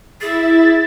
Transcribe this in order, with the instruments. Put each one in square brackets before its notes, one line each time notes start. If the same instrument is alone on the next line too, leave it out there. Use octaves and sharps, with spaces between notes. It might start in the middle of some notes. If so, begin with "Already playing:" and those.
[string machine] E4 E5 [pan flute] G#4 [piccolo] A6